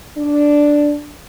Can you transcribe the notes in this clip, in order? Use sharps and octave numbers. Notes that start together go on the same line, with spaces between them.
D4